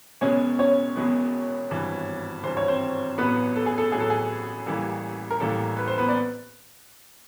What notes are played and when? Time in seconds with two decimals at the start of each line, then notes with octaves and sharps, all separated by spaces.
0.21 E1 E2 B2 G#3 B3 C#4 C#5
0.59 C#4 C#5
0.96 E1 E2 B2 G#3 B3
1.70 G#1 G2 E3
2.43 G#1 G2 E3 C5
2.57 C#5
2.68 C4 C5
3.18 A1 A2 F#3 B3 B4
3.56 A4
3.66 G#4
3.78 A4
3.92 A1 A2 F#3 G#4
4.00 A4
4.10 G#4
4.66 A1 A2 E3 G3 A#3
5.31 A#4
5.40 A1 A2 E3 G3 A#3 A4
5.77 B4
5.88 C5
5.98 B3 B4
6.08 D5